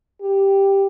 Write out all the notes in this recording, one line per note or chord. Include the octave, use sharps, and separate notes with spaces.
G4